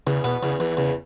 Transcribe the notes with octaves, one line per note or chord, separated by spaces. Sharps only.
E2 C#3
B2 B3
E2 C#3
E2 E3
E2 C#3